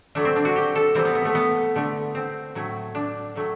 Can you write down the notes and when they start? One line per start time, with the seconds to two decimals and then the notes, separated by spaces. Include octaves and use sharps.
0.15 D3 F#3 A3 D4
0.25 C4
0.36 D4
0.45 F#4
0.56 G4
0.75 A4
0.95 C3 E3 G3 C4
1.05 B3
1.15 B3
1.25 A3
1.35 B3
1.76 D3 A3
2.15 C4
2.55 A2 F#3 A3
2.95 D4
3.36 A2 F#3 A3